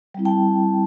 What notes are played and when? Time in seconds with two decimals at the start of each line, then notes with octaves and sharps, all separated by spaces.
0.14 G3 C4 E4
0.25 G5 A5